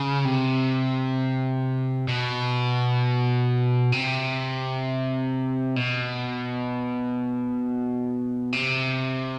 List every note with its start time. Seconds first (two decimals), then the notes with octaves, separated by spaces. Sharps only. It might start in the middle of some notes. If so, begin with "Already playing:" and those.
Already playing: C#3
0.25 C3
2.08 B2
3.92 C3
5.76 B2
8.53 C3